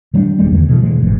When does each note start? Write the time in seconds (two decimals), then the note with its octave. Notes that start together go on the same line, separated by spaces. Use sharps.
0.14 D#3 G3 A#3 D4
0.38 E1 G3 G#3 A#3
0.51 E2 D3 E3
0.69 B2 D3 E3
0.82 B2 E3 G#3
1.02 G1 D2 G#2